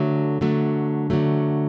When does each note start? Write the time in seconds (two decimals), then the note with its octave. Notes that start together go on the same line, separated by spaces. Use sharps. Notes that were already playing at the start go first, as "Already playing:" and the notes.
Already playing: D3 F#3 A3
0.41 D3 F#3 A3
1.10 D3 F#3 A3